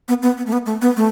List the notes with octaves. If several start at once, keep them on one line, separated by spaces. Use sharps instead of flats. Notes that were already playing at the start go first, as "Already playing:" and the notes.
B3
B3
B3
A3
B3
A3
B3
A3